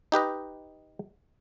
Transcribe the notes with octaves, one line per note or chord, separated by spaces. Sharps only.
D#4 G4 B4 D#5